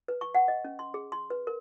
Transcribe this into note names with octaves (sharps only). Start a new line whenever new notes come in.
B4
C#6
F#5
D#5
C#4
C6
G#4
C6
B4
A#4